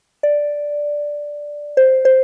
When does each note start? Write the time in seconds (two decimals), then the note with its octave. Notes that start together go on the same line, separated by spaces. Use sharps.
0.23 D5
1.77 C5
2.05 C5